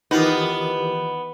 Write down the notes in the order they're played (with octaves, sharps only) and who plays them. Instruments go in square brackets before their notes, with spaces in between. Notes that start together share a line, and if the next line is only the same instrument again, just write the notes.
[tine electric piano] D#3 E3 G4 [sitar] B3 [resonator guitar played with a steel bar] D#4 F4